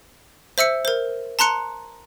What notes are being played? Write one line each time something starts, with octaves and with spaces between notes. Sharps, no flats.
C5 E5 E6 C#7
A#4 C5
A5 A#5 C6 F#6 C#7